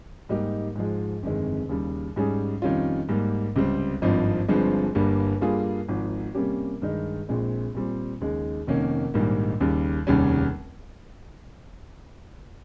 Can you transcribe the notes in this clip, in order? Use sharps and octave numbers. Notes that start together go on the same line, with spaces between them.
G#2 G3 A#3 D#4 G4
G#2 F3 G#3
G1 F2 C3 D#3 G#3
D#2 C#3 G3
G#2 G3 C#4 G#4
F2 D#3 G3 C#4 F4
G#2 G3 A#3
C#2 C3 G3 C4
G#1 G2 F3 C4 D#4
G1 G2 F3 G#3 C4
G1 G2 G3 A#3
G2 G3 A#3 F4 G#4
G#1 G#2 F3
C3 G3 A#3 C#4 G4
G2 D#3 G#3 D#4
A#1 A#2 G#3 C4
A#2 G3 C4
D#2 C#3 G#3 D#4
F1 F2 D#3 A#3 C#4
A#1 G#2 D#3 G3 A#3
D#2 C#3 G3
F1 D#2 C#3 G3 C#4